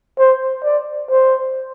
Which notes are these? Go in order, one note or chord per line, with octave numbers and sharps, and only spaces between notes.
C5
D5
C5